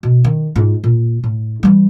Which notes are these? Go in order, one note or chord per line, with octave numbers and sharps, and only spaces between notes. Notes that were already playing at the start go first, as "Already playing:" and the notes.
B2
D#3
G#2 F4
A#2
A2
E3 G3